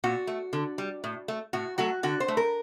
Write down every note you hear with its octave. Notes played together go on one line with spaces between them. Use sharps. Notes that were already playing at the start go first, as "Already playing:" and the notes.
A#2 F#4
A3
D3
G3
A2
A3
A2 F#4
F#3 A3 F#4
D3 F#4
C5
A3
A#4